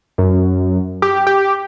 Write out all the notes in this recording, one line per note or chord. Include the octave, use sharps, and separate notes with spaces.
F#2
G4
G4